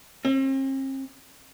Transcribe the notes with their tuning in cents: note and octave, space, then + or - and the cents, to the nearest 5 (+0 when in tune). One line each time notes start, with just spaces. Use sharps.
C4 +45